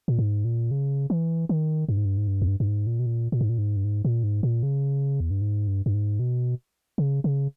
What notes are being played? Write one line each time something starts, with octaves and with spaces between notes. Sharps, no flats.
A#2
G#2
A#2
C#3
E3
D#3
G2
G#2
G2
G#2
G2
E2
G2
G2
G#2
A#2
B2
A#2
A#2
G#2
A#2
G#2
G2
G#2
A#2
G#2
A#2
C#3
E2
G2
G#2
G2
G2
G#2
B2
C#3
C#3